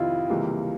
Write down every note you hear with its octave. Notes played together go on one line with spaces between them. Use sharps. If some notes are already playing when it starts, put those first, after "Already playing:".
Already playing: F2 C3 D#3 E4 F4
C#2 C3 E3 G3 A#3